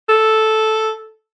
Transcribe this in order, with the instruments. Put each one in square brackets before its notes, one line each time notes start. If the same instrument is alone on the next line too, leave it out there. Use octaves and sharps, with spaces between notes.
[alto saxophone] A4